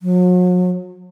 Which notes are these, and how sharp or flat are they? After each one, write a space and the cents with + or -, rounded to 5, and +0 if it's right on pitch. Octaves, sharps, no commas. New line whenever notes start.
F#3 -40